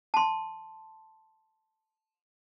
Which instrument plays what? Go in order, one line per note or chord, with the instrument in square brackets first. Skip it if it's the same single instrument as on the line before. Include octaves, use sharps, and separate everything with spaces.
[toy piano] A5 C6